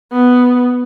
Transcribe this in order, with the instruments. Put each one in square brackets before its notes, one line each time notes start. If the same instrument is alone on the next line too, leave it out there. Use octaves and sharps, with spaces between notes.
[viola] B3